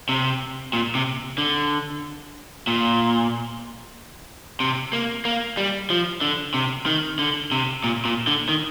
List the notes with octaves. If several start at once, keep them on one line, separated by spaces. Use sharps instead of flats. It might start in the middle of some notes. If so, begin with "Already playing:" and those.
C3
A#2
C3
D3
A#2
C3
A#3
A#3
G3
F3
D3
C3
D#3
D3
C3
A#2
A#2
D3
D#3